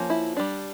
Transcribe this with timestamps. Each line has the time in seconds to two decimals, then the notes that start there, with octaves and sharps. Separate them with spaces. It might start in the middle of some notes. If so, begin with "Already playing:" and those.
Already playing: F3 A#3 C#4
0.10 E4
0.37 G3 D4